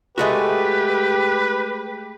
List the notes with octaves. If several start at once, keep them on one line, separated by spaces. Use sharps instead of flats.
G#3 A3 F#4 G4 B4